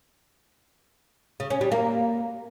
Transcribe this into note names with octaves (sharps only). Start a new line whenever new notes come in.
C#3
C#4
G3
A#3